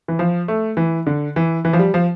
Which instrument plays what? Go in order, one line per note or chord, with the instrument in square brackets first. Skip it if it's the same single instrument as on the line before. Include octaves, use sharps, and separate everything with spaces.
[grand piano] E3
F3
A3
E3
D3
E3
E3
F3
G3
F3